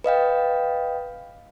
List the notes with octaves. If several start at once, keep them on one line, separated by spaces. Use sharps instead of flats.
B4 D#5 F5 G5